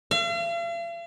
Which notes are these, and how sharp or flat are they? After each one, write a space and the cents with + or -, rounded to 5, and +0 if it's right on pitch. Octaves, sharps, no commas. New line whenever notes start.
F5 -45